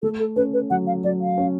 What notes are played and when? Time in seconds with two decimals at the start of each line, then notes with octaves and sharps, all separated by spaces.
0.02 A3 A4
0.19 A4
0.36 C#4 B4
0.53 B4
0.70 F#3 F#5
0.87 F5
1.04 F#3 D5
1.21 F5
1.38 C#4